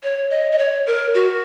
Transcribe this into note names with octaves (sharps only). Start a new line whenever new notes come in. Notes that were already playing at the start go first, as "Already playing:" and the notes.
C#5
D#5
D#5
C#5
A#4
F#4